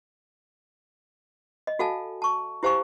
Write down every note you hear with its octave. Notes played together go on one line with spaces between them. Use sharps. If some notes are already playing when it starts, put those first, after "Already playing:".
D#5
F#4 A4 F5 G#5 A5
A5 C#6
E4 G4 C5 F5 G#5 C#6